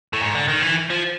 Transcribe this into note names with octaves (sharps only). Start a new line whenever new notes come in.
A2
G#2
D3
D#3
E3
F3